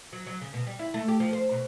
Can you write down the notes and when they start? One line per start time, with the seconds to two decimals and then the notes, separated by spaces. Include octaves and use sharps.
0.13 F#3
0.27 F#3
0.41 C#3
0.54 B2
0.67 G3
0.79 E4
0.94 A3
1.08 G4
1.20 F3
1.33 C5
1.51 B2